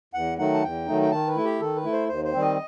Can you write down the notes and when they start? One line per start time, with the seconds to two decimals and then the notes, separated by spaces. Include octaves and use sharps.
0.14 E2 F#5
0.38 D#3 F#3 A3 D#4 F#5
0.54 A5
0.63 E2 G5
0.87 D#3 F#3 A3 D#4
1.02 G5
1.11 D#3 A5
1.28 B4
1.36 A3 E4
1.44 G4
1.60 D#3 A4
1.76 B4
1.84 A3 E4
1.92 C5
2.08 D#2 C5
2.25 C5
2.33 D#3 G3 C4
2.41 D#5